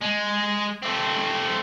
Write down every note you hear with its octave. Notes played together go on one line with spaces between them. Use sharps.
G#3
A3 C4